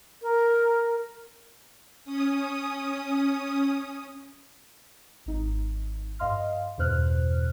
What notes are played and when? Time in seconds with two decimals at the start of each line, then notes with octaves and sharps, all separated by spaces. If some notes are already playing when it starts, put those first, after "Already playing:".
0.22 A#4
2.05 C#4 D#6
5.26 G#1 D#4
6.19 G2 D#5 F5 C6 F6
6.78 E2 G2 B2 C5 F6 F#6